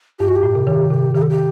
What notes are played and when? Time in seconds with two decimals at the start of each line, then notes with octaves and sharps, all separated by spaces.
0.19 G2 G4
0.28 F#4
0.35 G4
0.43 A2
0.55 C3
0.67 D#3
0.90 C3
1.15 D#3 G4
1.22 A4
1.29 G4